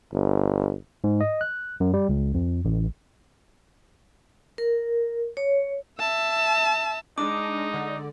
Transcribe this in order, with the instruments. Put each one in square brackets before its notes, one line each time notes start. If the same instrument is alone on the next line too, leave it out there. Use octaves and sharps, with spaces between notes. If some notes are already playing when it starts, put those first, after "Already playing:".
[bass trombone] G1
[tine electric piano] G#2
D#5
F#6
F#2
G3
C#2
F2
A1
[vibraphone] A#4
C#5
[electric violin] E5 A5
[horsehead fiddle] G#3 [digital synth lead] D4 [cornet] D#4 [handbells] D6
[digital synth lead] D3